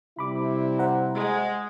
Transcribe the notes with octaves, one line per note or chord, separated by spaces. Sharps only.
C3 G3 E4 B5 D6
C5 F#5 A#5
G#3